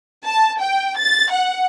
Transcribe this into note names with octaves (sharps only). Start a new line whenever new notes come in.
A5
G5
A6
F#5